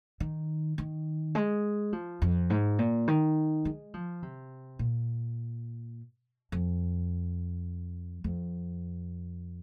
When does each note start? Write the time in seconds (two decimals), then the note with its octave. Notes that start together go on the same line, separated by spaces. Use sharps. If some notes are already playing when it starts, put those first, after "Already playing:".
0.20 D#3
0.78 D#3
1.35 G#3
1.92 F3
2.22 F2
2.50 G#2
2.79 A#2
3.08 D#3
3.65 G#3
3.94 F3
4.22 C3
4.79 A#2
6.52 F2
8.24 F2